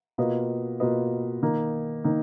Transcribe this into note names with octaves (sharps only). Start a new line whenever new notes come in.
B2 A#3 F4 B4 D#5
B2 A#3 F4 B4 D#5
D#3 A#3 D#4
D#3 A#3 D#4